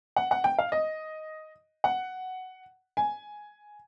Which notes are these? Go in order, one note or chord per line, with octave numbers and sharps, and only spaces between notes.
F#5
F#5
G5
F5
D#5
F#5
G#5